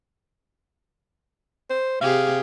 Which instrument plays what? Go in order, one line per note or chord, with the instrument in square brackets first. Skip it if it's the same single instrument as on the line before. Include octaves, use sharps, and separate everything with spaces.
[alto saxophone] C5
[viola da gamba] C3 G4 G#4 [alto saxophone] F5